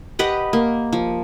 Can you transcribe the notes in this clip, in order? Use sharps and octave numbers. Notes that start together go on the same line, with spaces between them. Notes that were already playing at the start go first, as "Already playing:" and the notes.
G4 B4 D#5 F#5
A#3
F3